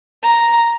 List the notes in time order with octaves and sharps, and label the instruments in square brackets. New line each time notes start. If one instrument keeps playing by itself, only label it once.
[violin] A#5